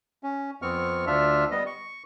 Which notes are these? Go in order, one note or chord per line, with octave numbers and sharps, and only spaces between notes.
C#4
F2 B3 C4 C#6 F6
D2 D4 F4 E5 F6
G3 B3 D#5
C#6